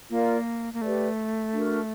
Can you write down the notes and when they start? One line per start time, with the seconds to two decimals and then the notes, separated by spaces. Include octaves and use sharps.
0.10 A#3 F4 A#4 D5 F5
0.73 A#3
0.81 A3 G4 B4 D5
1.52 D4 F#4 A#4